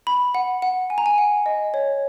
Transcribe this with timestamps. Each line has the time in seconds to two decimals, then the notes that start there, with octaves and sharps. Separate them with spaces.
0.07 B5
0.35 F#5
0.62 F#5
0.90 G#5
0.98 A#5
1.06 G#5
1.18 F#5
1.46 D#5
1.74 C#5